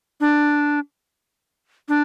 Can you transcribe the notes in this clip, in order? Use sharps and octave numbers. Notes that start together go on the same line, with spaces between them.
D4
D4